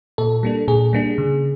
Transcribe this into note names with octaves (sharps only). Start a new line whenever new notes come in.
A#2 A4
G3 A#3 D4
A#2 G#4
G3 A#3 D4
C#3